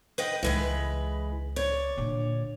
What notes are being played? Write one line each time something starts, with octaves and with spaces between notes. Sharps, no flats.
B4 D#5 G5
C#2 E3 G#3 B4
C#5 D5
A#2 D3